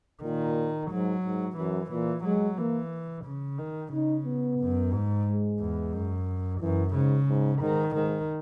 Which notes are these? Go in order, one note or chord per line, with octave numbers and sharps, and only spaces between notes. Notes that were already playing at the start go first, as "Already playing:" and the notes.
A#2 D#3
G#2 F#3
G#2
F#2 E3
A#2 E3
F#3 G#3
E3 A#3
C#3
D#3
C#3 D#4
B3
F#2
G#2
G#3
E2
F#2
F#2 E3
G#2 C#3
G#2
G#2 D#3
G#2 D#3